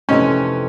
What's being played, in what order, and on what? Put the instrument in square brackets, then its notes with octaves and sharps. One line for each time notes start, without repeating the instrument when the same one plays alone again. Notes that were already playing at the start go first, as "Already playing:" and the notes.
[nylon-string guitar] F2 C3 E3 A3 [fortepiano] C#4 D#4